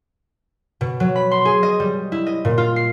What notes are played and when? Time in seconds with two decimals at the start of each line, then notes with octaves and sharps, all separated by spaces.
0.81 B2
1.00 F#3
1.16 B5
1.31 C6
1.45 G#4
1.63 D#5
1.80 G3
2.12 E4
2.26 D#5
2.45 A#2
2.58 F4
2.76 C7